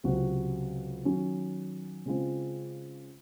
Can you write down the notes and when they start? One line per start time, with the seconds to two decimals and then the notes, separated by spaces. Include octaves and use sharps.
0.04 C#2 C3 F#3 C4 F#4
1.05 D#3 F#3 C#4
2.06 C#3 G#3 C4 F4